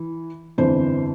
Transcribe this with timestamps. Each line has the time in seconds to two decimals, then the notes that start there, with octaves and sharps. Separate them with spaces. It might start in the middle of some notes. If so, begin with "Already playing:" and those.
Already playing: E3
0.58 G1 F2 E3 C5